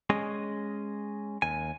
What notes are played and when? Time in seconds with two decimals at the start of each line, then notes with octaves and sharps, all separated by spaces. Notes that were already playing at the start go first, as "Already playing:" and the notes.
0.10 G#3 C#4 D#5
1.42 D#2 G#5